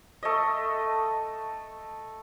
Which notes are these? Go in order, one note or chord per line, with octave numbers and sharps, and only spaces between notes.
A3 D#5